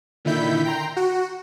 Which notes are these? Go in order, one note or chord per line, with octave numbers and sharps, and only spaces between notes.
A#2 D3 D#3 E4 G6 B6
G5 A#5 C6
F#4